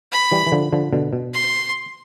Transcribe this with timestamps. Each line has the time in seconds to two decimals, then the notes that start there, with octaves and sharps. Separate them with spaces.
0.12 B5
0.32 E3 G3
0.47 E3
0.52 D3 F3
0.72 D3 F3
0.93 B2 D3
1.13 B2
1.33 C6